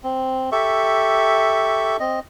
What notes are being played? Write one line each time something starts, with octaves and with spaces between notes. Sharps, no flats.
C4
G4 A4 E5 C#6
C4 D#5